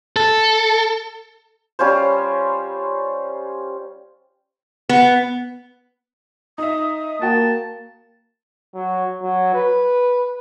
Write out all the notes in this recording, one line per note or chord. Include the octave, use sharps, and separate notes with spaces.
A4
G3 C#4 F4 C5
B3
D#4 E5 D#6
A#3 F#4 G5 A5
F#3
F#3
B4